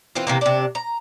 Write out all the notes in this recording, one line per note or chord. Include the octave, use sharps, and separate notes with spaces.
E3 C4 F4
C3 E3 A#3
C3 D4
A#5